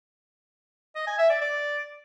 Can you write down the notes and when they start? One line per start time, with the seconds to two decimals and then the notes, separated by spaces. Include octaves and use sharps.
0.95 D#5
1.07 G#5
1.18 E5
1.30 D5
1.41 D5